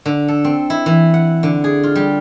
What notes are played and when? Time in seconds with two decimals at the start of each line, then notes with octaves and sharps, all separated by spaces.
0.06 D3
0.28 A4
0.44 C4
0.70 E4
0.86 E3
1.14 F#5
1.43 D3
1.64 G#4
1.83 F4
1.95 G3